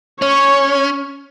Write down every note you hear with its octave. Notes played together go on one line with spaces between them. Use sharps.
C#4 C#5